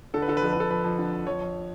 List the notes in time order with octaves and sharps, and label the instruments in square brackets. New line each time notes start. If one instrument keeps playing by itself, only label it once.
[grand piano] D3 A4
B4
D3 A4
B4
F2 A4
B4
D3 A4
F2 B4
F2
D3
F2
F2 C#5
F2